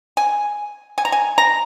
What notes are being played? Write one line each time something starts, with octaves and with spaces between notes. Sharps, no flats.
G#5
G#5
A#5
G#5
A#5